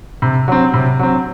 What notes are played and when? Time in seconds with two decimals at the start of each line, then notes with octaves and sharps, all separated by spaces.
0.22 C3
0.48 F#3 C4
0.74 C3
0.99 F#3 C4